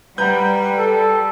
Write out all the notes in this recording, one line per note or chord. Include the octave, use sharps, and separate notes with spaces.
G3 B4 F#5 A#5 G6
A4